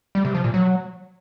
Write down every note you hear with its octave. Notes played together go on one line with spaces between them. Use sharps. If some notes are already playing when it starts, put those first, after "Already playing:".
G3
C3
F3
A#2
F#3